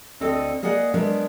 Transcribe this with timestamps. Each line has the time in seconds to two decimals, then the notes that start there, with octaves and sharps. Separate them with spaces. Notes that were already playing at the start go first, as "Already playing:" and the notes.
0.20 D2 D3 C4 A4 D5 D#5
0.62 A#3 G#4 D5 D#5 F#5 G#5
0.94 F#3 G#3 B3 D4 A#4 E5